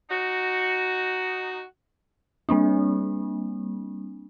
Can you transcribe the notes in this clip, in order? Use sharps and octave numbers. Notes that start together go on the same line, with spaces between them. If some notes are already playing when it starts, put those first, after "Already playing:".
D#4 F#4
G3 A#3 C4 D4